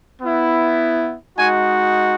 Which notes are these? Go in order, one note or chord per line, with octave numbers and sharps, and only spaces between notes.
B3 E4
G#3 D#4 F#4 G#5